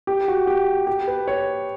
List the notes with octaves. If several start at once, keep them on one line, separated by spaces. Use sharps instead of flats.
G4
F#4
G4
G4
B4
C#5